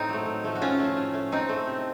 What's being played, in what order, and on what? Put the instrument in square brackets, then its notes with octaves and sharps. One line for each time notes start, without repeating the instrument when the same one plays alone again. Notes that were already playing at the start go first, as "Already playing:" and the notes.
Already playing: [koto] A2 C4 D#4
F#3 A3
A2
F3 A3
F#4
A2 C#4 F4
F3 A3
A2
A3
A2 C4 D#4
A3
C3